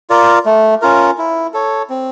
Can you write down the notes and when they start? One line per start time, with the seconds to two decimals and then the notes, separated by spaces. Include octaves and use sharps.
0.10 F4 A#4 D5
0.46 A3
0.82 C#4 F4 A#4
1.18 E4
1.54 A4 C#5
1.90 C4